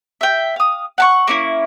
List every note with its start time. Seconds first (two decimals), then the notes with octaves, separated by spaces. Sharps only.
0.21 E5 G5
0.56 F5 D#6
0.98 F#5 A5 C#6
1.28 A#3 C#4 E4